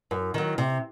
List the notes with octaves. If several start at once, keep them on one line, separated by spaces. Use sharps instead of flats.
F#2
D#3 F#3
C3